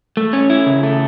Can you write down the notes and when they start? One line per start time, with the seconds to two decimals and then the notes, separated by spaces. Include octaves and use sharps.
0.17 A3
0.33 C#4
0.50 E4
0.66 C#3
0.83 A3